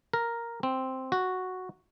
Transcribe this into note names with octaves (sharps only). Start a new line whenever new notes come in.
A#4
C4
F#4